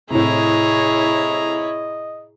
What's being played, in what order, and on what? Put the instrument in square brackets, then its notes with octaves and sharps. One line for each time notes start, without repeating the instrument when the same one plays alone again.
[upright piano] A2 C3 [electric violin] E4 C#5 [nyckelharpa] G#4 A#5 [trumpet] D#5